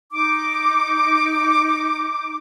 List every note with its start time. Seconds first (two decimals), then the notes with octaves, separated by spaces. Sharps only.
0.11 D#4 D6